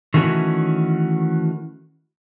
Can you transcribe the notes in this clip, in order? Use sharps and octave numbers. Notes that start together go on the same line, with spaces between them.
D#3 E3 A3 C#4 F#4